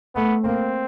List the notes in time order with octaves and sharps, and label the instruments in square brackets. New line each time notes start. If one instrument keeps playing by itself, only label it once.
[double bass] A3 [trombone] B3
[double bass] A#3 [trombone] C4